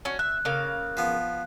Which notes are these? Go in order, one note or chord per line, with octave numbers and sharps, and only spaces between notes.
C#4 F#4
E5 F#6
C#3 A#3 F5
F3 B3